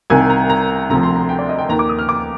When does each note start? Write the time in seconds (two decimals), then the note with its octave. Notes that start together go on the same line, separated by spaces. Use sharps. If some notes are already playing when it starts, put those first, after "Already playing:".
0.10 C2 C3 D#3 G#5
0.30 A#5
0.49 A#5
0.89 D2 C3 F3 A#5
1.03 C6
1.15 A#5
1.29 G5
1.39 D5
1.49 D#5
1.58 G5
1.69 D#2 A#5
1.72 D#3
1.79 D6
1.89 D#6
1.99 F6
2.09 D6